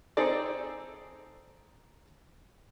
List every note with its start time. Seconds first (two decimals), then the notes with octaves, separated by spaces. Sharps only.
0.17 C4 D#4 G#4 A4 D5